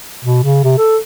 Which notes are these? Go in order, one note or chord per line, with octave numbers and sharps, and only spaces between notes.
B2
C#3
C3
A4